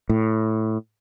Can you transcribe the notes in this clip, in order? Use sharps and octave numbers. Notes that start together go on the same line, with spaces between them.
A2